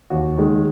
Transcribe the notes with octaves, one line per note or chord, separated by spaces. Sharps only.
D#2 F#4
D#3 G#3